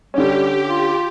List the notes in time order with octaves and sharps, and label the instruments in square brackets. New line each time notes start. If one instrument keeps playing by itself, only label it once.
[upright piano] D3 C#4 [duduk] G3 [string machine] G4
[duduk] F4